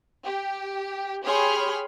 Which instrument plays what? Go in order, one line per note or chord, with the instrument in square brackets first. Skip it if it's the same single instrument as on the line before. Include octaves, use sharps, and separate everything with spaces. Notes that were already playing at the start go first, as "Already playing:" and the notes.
[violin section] G4
G4 G#4 C#5 B5 C6 F6